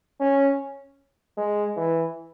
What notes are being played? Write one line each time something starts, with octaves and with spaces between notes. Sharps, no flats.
C#4
G#3
E3